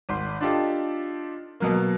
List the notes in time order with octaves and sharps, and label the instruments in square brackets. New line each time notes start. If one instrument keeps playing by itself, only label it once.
[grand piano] G#1 C6
D4 D#4 F4 G4 A4
B2 F#3 A#3